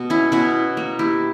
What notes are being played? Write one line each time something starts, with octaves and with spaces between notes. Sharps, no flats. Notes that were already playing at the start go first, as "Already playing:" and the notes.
Already playing: B2
C#4 E4
B2 C#4 E4
A#3
E4 G4